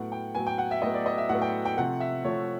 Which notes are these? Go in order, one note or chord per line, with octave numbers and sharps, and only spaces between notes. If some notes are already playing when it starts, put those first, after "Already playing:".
Already playing: A2 F#3 B3 F#5
G5
A2 F#3 B3 G#5
G5
F#5
E5
A2 F#3 B3 D#5
D5
D#5
E5
A2 F#3 B3 F#5
G5
G5
C3 F3 A3 F#5
E5
C3 F3 A3 C#5